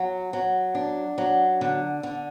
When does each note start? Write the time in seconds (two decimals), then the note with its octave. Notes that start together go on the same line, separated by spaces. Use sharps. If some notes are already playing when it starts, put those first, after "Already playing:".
Already playing: F#3
0.33 F#3
0.75 D4
1.18 F#3
1.61 D3
2.03 D3